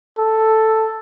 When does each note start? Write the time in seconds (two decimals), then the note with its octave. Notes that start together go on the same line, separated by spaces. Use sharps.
0.19 A4